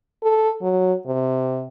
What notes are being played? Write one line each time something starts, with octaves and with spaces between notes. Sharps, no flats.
A4
F#3
C3